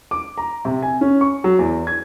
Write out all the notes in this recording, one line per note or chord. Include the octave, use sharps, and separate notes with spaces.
D6
A#5
C3
G#5
C#4
C#6
F#3
E2
G#6